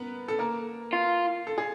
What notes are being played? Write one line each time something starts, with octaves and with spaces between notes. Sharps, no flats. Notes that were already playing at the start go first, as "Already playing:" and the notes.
Already playing: B3 A#4 B4
A4
A#3 A#4
F4
A4
G#4